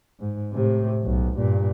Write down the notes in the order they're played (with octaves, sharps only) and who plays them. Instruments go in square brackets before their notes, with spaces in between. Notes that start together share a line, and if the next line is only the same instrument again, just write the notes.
[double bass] G#2
A2 C3
B1
G2 A#2